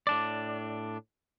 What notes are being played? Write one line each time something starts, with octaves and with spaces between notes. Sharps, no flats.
A2 D4 D5